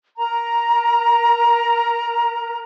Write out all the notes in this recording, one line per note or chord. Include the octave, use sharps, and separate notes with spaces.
A#4 A#5